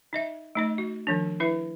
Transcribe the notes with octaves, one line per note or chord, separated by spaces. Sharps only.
D#4 D#5 E5
A3 D#4 D#5
F#4
D#3 F3 D4
E4 B4 E5